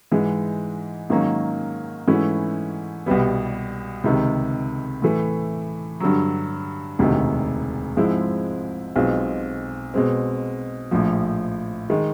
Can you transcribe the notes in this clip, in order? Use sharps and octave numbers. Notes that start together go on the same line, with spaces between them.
G#2 E3 G#3
G#2 D#3 F#3 A#3 C#4
G#2 E3 A3 C#4 E4
C2 B2 G3 B3
C#2 C3 D#3
A2 E3 A3
G2 D3 F#3
E1 D2 C3 D#3
G#2 F3 G#3 C4 E4
B1 B2 G#3 C4 F4
B2 G#3 C4
A#1 A2 F3
D#3 G#3